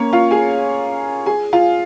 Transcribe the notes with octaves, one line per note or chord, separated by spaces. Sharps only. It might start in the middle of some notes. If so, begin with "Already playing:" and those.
Already playing: A#3 C#4 A#4 C#5
F4 F5
G#4 G#5
G#4 G#5
F4 F5